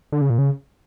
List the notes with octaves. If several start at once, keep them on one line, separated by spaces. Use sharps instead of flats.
D3
C#3
A#2
C#3